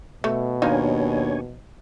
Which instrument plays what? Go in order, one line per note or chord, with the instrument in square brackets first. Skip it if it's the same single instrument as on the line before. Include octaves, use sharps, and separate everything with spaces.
[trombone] B2 [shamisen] A3
[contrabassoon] D#2 [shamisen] F3 D#4 F4 [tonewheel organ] D4 C#5 G#5